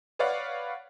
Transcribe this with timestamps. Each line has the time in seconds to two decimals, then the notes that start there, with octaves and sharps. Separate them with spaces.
0.19 B4 C#5 D5 F5 F#5